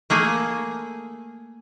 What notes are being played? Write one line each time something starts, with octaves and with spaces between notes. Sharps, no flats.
A3 A#3 G#4